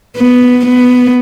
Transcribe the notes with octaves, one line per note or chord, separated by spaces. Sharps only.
B3
B3